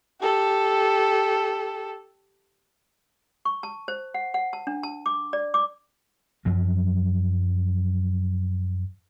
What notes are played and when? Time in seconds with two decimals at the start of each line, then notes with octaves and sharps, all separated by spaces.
0.21 G4 A4
3.45 C#6
3.63 A5
3.88 C5
4.14 F#5
4.34 F#5
4.53 A5
4.67 D4
4.83 A5
5.06 D6
5.33 D5
5.54 D6
6.45 F#2 F3 F#3